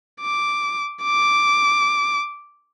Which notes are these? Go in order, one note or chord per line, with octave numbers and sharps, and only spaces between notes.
D6
D6